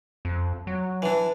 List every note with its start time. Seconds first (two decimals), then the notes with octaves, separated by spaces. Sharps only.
0.25 F2
0.67 F#3
1.02 E3 D4